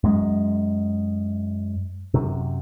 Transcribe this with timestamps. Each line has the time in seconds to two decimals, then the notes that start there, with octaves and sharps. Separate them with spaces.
0.04 F#2 G#3
2.14 F#2 C3